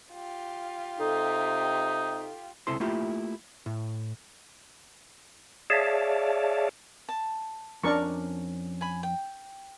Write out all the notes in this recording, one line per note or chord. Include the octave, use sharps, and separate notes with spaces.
F4 G4
C3 D#4 A4
C#2 C3 E4 A4 C5 C6
A3 A#3 E4 F4 G4
A2
G#4 C#5 D5 E5 F5 A5
A5
F2 C#4 D4 A#4 D5 C#6
G#5 B5
G5